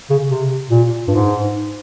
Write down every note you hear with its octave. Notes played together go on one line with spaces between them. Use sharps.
C#3
C3
A#2
G2
G#2